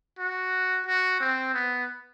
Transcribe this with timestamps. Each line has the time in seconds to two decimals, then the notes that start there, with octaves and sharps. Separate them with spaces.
0.19 F#4
0.87 F#4
1.21 C4
1.54 B3